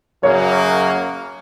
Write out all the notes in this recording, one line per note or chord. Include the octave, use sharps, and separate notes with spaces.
F#2 C#3 F#3 A#3 C#5